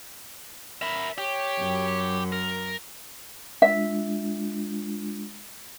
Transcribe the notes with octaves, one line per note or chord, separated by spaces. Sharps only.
A#4 E5 B5
G4 C#5
F#2
A#4
G#3 D4 F4 E5